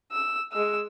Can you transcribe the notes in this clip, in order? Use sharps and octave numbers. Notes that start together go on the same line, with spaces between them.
E6
G#3 E6